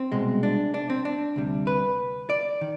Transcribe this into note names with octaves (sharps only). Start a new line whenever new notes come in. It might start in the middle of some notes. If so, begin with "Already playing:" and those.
Already playing: C4
C2 B2 G#3
D4
D4
C4
D4
D2 C3 G3
B4
D5
D#3